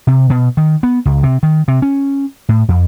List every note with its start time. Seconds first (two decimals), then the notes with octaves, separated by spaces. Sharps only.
0.07 C3
0.30 B2
0.57 D#3
0.83 B3
1.05 C#2
1.23 C3
1.43 D#3
1.68 C3
1.82 C#4
2.49 A2
2.68 F2